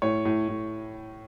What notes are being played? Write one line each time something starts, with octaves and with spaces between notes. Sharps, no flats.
A2 C#5
A2
A2